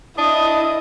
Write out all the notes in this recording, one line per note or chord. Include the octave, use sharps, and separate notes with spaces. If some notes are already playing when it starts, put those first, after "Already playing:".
D4 E4 D#5 D#6